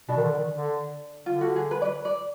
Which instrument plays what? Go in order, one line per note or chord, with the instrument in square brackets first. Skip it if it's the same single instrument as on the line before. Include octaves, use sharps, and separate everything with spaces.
[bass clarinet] B2 [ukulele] D4
[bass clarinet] D#3
D3
D#3
D3
[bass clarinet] D3 [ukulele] F4
[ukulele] F#4
G#4
B4
D5
B4
D5